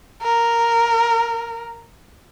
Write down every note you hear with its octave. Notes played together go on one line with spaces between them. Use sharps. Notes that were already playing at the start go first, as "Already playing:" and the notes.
A#4